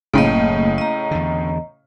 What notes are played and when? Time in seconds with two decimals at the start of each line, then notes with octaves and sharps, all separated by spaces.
0.14 F#1 A2 C#3 A3 A#3 D#5
0.78 D#5 A#5
1.11 E2 D3